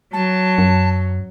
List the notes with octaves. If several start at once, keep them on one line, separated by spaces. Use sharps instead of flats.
F#3 A5
F#2